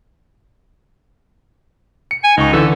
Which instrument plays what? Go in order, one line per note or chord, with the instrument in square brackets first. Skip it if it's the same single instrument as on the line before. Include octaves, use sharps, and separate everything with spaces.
[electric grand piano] C#7
[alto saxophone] G#5
[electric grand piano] C#2 C#6 [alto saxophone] D#4
[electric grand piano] D3 E3 [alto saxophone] A4